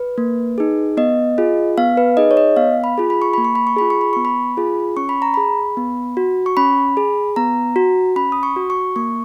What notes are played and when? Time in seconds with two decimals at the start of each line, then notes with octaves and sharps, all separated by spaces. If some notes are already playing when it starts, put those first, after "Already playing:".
Already playing: B4
0.18 A#3
0.58 D#4 G#4
0.97 B3 D#5
1.38 F4 G#4
1.77 B3 F5
1.97 B4
2.17 D#4 G#4 D#5
2.31 C#5
2.37 D#5
2.57 B3 F5
2.84 B5
2.98 F4 G#4
3.10 B5
3.22 C#6
3.33 A#3 B5
3.45 C#6
3.55 B5
3.67 C#6
3.76 F4 G#4 B5
3.90 C#6
4.01 B5
4.13 B3 C#6
4.25 B5
4.57 F4 G#4
4.97 C#4 C#6
5.09 B5
5.22 A#5
5.34 G#4 B5
5.77 B3
6.17 F#4
6.46 C#6
6.57 C#4 B5
6.97 G#4
7.36 B3 A#5
7.76 F#4
8.16 C#4 B5
8.32 D#6
8.43 C#6
8.56 F#4
8.70 C#6
8.96 A#3 C#6